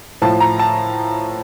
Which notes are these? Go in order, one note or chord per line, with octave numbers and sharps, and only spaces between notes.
A2 F3 A5
A#5
A5